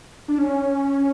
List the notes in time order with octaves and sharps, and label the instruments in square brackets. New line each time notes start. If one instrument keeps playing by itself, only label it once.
[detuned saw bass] D4
C#4